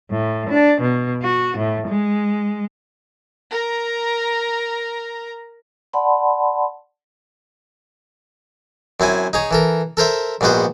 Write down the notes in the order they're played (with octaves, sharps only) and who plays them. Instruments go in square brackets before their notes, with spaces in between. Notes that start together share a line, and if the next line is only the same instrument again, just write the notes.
[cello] A2
D4
B2
F#4
A2
G#3
[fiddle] A#4 A#5
[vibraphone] D5 F#5 A5 B5 C6
[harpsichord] F#2 C4 E4 G#5
D#4 G#4 C#5
E3 A4 A#4
A4 A#4 C5 E5
A#1 G#2 B3 F#4 C5